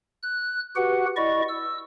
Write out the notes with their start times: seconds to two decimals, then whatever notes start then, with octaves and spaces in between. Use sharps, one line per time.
0.23 F#6
0.76 F#4 G4 B4 F#5
1.17 E4 D5 D#5 C#6
1.49 E6